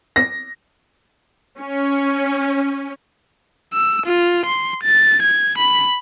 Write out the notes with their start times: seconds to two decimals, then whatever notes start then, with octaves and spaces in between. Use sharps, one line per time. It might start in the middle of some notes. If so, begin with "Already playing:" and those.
0.16 A#6
1.60 C#4
3.73 E6
4.06 F4
4.45 C6
4.83 A6
5.22 G#6
5.58 B5